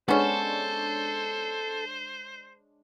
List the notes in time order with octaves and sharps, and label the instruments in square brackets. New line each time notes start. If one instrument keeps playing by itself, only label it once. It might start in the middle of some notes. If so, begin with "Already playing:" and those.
[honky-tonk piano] G#3 D4 C#5 [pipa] B3 C#4 [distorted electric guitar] A4 [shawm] C5